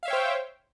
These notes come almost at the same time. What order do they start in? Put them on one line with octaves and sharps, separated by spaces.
F5 E5 C#5 G5 C5